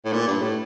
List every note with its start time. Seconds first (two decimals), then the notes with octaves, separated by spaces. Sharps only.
0.05 A2
0.13 A#2
0.28 G2
0.41 A2